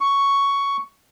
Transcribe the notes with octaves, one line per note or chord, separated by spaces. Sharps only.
C#6